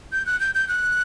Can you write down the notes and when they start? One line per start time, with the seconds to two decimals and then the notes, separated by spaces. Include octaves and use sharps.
0.12 G6
0.26 F#6
0.40 G6
0.55 G6
0.69 F#6